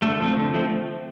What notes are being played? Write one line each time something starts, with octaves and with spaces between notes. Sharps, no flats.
D3 A3 A4
F3 A3 C4
D3
F3 A3 C4